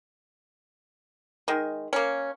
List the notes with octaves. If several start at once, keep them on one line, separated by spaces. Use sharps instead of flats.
D#3 G#3
A#3 C#4